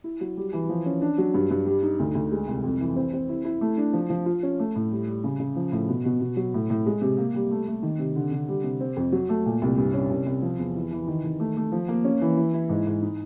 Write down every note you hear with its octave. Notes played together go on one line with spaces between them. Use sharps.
E4
F#3
G3
E3
F3
C#4
D4
F#3
G2
G2
G3
D#4
D2
D2
G#3
C2
F2
E3
C4
C4
E4
E4
A3
D4
F3
F3
F4
C#4
A3
A2
G3
G3
C#3
C#3
F3
A2
B2
B2
B2
F#3
A2
A2
G#3
C3
A#3
G3
A3
A3
D#3
C3
D3
D3
G3
C3
C4
F2
F#3
A3
A#2
C2
G2
C#4
C2
C2
F3
E2
E3
E3
D#3
D#3
A3
A3
F3
A#3
C#4
E3
E4
E4
G#2
G#2
D#4